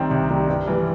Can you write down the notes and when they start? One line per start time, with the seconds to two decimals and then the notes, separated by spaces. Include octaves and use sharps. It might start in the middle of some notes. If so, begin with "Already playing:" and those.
Already playing: C2 C3 D#3 G3 C4
0.11 C2
0.29 C3 D#3 G3 C4
0.48 G2
0.67 E3 G3